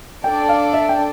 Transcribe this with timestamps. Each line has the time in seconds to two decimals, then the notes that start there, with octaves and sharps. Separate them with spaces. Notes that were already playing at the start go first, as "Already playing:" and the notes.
0.24 D4 A4 D5 G5
0.49 F5
0.74 E5
0.89 G5